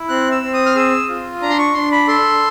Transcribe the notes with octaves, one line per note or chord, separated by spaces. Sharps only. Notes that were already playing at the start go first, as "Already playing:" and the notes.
Already playing: E4
C4 F#6
E6
C4
D#6
F6
G#4 E6
F4
D4 A#5
C6
C#6
D4 C6
B5
A4 C6